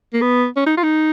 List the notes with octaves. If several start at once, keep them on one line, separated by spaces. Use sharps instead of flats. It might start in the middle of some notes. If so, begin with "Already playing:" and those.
A#3
B3
C#4
D#4
F4
D#4